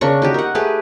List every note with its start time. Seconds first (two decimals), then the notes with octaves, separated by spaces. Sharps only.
0.01 C#3 D4 A#4 C#6
0.22 D#4 F#4 G4
0.34 A#4 F#5
0.55 A3 G4 G#4 B4